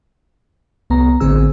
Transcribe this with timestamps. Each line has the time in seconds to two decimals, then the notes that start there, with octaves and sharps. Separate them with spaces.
0.90 C2 B3 A#5
1.20 A1 D3 C4 G#4 E6